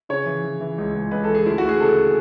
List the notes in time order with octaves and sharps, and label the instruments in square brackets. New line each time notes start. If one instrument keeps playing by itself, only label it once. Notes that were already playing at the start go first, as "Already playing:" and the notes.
[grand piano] C#3 C#5
E3
E3
E3
C#2
C#2
C#2 B4
A4
E3
G#4
D2 E4
D2 F#4
G#4
C#3 A4